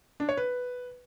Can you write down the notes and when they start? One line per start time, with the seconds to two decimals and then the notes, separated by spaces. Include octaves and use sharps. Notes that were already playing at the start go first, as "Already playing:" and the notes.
0.20 D4
0.29 C#5
0.37 B4